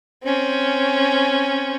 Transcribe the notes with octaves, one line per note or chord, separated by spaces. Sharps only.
C4 C#4